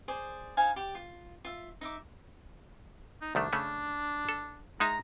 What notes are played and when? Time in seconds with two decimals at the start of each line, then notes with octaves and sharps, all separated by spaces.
0.08 G#4 C5 D5
0.57 D#4 C5 F5 G#5
0.76 G4 D5
0.95 F4
1.45 F4 E5
1.81 D#4 E5 D6
3.21 D#4
3.35 C2 D#3 A3 D4
3.53 C#3 A3 C#4
4.29 A4
4.80 G#3 D#4 E5 A#5